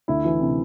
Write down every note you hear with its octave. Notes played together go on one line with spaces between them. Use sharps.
D2 E4
E3
C3